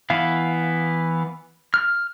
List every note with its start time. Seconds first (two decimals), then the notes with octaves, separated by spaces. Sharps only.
0.10 E3 B3 F5
1.74 F6